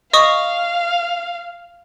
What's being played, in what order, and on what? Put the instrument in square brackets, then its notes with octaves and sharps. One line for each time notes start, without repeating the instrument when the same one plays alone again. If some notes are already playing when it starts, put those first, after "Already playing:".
[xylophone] D#5 C#6 D#6 [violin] F5